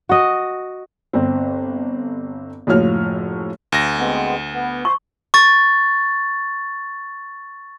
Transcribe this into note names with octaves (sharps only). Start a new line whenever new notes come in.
F#4 D#5
G1 C4
F#1 A2 F3 F#4 C#5 F6
D2 A#6
G#3 B3 C4
B3
C5 C#6
C#6 A6